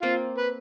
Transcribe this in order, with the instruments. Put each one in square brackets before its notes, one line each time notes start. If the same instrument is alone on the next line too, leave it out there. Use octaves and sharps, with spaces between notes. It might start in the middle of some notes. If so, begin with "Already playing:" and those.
[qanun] A#3 C4 [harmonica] F4
[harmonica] B4